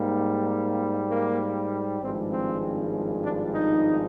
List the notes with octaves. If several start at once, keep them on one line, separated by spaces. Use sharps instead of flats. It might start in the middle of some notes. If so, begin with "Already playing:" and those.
Already playing: G#2 G3 A#3
A#3
G#1 G2 F3 G#3 C4
C4
D4
D#4